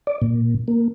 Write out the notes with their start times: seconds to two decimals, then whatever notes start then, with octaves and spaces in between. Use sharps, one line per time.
0.07 D5
0.22 A#2
0.68 A#3